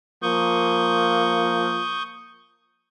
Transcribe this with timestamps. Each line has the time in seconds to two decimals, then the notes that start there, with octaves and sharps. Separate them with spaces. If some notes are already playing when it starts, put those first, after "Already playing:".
0.23 F3 A#3 C#6 D#6 G6